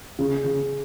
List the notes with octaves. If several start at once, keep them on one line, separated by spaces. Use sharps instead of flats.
C#3
C#3